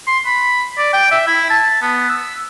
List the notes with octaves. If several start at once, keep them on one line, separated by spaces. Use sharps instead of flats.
C6
B5
D5
G5
E5
E4
A5
B3
E6